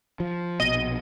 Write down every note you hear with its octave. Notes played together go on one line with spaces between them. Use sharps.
F3
A#1 B2 D#5